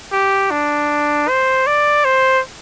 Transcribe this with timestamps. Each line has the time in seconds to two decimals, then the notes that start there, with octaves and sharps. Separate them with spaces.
0.12 G4
0.51 D4
1.28 C5
1.67 D5
2.05 C5